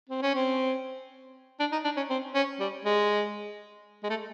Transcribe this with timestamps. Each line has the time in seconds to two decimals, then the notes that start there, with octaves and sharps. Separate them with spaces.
0.09 C4
0.22 C#4
0.35 C4
1.60 D4
1.72 D#4
1.84 D4
1.97 C#4
2.10 C4
2.35 C#4
2.60 G3
2.85 G#3
4.03 G#3
4.10 A3